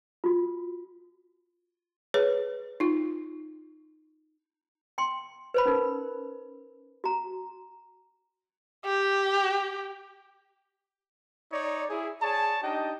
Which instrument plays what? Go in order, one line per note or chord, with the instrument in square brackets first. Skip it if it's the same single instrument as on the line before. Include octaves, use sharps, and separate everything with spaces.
[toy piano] F4 F#4
[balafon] G#4 B4 C#5
D#4 F4
[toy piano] G5 C6
B4 C5 B5
C#4 D#4 A#4
F#4 A#5
[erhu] G4
[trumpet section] D#4 C#5 D5
E4 G#4
G#4 C#5 D5 A5
D4 D#4 G4 D#5 G5